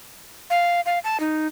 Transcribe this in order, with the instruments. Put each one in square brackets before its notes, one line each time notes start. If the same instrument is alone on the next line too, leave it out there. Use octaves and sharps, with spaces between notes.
[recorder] F5
F5
A5
D#4